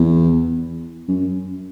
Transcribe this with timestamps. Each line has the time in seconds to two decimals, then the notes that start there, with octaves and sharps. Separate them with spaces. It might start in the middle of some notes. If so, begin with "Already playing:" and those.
Already playing: E2
1.08 F#2